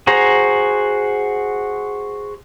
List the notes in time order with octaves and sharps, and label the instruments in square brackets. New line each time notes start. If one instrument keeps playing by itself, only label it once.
[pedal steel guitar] F#4 G#4 C5 A#5